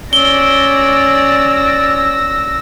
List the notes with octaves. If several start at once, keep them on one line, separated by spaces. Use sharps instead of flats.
C#4 D5 E6 A#6 G7